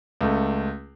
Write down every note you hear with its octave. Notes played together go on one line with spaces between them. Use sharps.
C#2 A3